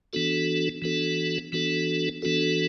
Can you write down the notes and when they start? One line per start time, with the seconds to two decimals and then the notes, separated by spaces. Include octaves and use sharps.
0.13 E3 B3 D4 F#4 A4
0.82 E3 B3 D4 F#4 A4
1.52 E3 B3 D4 F#4 A4
2.22 E3 B3 D4 F#4 A4